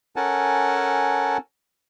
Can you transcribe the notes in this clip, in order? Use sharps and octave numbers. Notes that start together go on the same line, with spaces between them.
C#4 A4 A#4 F#5 G#5 A5